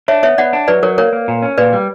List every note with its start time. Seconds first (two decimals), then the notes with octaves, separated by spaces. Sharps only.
0.08 D4 C#5 E5
0.23 B3 C#5 E5
0.38 B3 D5 F#5
0.53 D4
0.68 F#3 B4 D5
0.83 F#3 A#4 C#5
0.98 A#3 A#4 C#5
1.13 A#3
1.28 A#2
1.42 C#4
1.58 A#2 B4 D5
1.73 G3